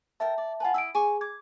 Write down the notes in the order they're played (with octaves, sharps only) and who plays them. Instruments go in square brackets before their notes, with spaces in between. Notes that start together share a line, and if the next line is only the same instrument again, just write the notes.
[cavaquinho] A4 A#4 G5 [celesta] E5 A5
[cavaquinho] D5
[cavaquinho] F4 B4 [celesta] F#5 G#5 A5
[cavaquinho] E4 D#5 [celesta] E6 D7
[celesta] G#4 [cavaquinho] G#5 C#6 D6
[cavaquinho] D6 [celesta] G#6